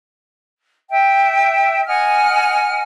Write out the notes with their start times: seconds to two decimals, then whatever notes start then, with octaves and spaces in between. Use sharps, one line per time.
0.90 E5 G5
1.87 D#5 F#5 G#5 F6